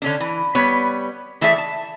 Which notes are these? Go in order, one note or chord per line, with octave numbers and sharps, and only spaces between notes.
D3 C#4 D4
E3
G3 B3 B4 C#5
E3 A3 G#4 D5 E5
A5